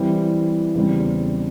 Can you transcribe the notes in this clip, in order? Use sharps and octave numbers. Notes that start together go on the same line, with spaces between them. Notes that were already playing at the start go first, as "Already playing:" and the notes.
Already playing: E3 G3 C4
E2 C#3 G3 C4